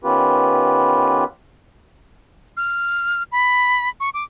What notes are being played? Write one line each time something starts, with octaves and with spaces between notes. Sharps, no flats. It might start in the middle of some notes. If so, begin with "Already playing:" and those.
D#3 B3 C#4 F4 G4 B4
F6
B5
C#6
D6